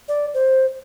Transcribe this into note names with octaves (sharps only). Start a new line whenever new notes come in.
D5
C5